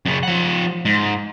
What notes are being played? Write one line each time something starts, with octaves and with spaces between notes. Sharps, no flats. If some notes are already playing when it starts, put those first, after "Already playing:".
F#2 C#3
F3 F#5
G#2